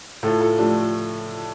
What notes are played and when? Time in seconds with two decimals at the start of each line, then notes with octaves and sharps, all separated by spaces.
0.23 A2 F4 A4
0.40 F4 A4
0.58 F3 A3 D4 G4